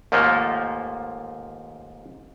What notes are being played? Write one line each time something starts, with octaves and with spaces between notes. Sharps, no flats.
D#2 G#2 F3 A3 A#3